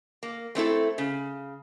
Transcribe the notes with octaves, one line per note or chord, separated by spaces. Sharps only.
A#3
A3 C4 E4 A4
C#3